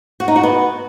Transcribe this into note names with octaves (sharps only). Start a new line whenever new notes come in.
F#4
D#4
F#4
B3